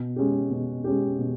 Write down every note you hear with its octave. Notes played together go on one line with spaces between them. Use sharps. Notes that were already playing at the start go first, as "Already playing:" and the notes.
Already playing: B2
G#3 C#4 G4
B2
G#3 C#4 G4
B2